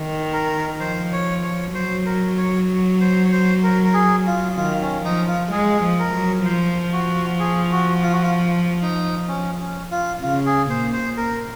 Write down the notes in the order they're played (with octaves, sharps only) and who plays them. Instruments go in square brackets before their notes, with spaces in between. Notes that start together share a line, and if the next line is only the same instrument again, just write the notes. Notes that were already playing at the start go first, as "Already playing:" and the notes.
Already playing: [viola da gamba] D#3
[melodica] A#4
[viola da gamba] F3 [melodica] C5
[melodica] C#5
C#5
[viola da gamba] F#3 [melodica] C5
[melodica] A#4
C#5
C5
C#5
C5
A#4
A#4
G#4
F4
[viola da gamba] D#3 [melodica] F4
[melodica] C#4
[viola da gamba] F3 [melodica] D#4
[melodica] F4
[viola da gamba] G#3 [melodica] G#4
[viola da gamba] F3
[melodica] A#4
[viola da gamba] F#3
[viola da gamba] F3 [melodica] C5
[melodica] F#4
G#4
F#4
F4
F#4
F4
D#4
C#4
C#4
F4
[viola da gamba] C#3 [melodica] F4
[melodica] G#4
[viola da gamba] A#2 [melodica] C5
[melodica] C5
A#4